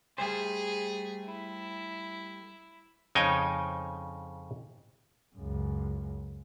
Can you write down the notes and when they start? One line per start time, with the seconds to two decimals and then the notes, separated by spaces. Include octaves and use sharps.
0.18 G3 A3 G#4 C5
1.26 E4
3.15 F2 C#3 D#4 C#5 G5 G#5
5.36 C#2 F#2